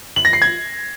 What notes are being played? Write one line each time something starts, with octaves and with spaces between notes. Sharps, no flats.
F#7
A#6
C7
G#6